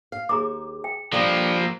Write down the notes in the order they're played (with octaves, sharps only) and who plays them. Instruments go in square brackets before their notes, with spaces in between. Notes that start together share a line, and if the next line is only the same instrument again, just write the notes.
[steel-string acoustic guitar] F5
[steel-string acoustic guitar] D#2 [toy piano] G#4 A#5 D6
[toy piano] G5
[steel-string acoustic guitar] D3 G3 G4 [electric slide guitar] F3 A#3